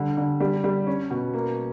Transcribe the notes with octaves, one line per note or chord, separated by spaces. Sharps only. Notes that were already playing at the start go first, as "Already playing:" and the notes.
Already playing: D3 G3
D3
G3
G3
C#4
B2
A#3